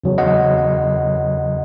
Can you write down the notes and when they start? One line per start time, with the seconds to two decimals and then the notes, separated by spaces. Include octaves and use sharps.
0.04 E2 C#3 F#3
0.18 D#5 F#5